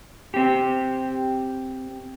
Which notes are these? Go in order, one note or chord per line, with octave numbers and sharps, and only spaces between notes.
C4 G4